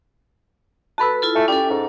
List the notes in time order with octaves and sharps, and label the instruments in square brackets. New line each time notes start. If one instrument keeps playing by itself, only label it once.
[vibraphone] F#4 A4 B4 [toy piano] A5 B5 E6
[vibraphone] E4 F4 A4
[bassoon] A3 [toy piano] E5 G#5
[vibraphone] C#4 A4 [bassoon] G4
[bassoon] G#2